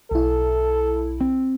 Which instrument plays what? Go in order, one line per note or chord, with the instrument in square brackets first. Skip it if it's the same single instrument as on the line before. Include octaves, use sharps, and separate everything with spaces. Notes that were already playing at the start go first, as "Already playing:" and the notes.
[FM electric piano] B1 E4 [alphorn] A4
[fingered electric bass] C4